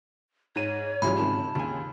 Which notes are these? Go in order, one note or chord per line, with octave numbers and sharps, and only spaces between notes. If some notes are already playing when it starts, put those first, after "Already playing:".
G#2 C#5 D#7
G#2 C#3 E3 F#3 G3 F4 B5
C3 D#3 A5
D#2 C#3 G#5